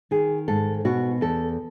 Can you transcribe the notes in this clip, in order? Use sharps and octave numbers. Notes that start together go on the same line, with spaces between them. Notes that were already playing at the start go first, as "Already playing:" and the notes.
D#3 G#4
G#2 A4
B2 F#4
E2 A4